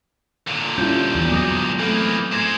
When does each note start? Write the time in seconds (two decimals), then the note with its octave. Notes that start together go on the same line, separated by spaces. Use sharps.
0.47 A#2 D3
0.78 G3 C#4 E4 F4 G6
1.15 E2 B3
1.32 F#3 G#3 D6 D#6 A#6
1.80 E3 A3 A#3 C4 A4
2.33 G#4 C5 G#6 A#6 E7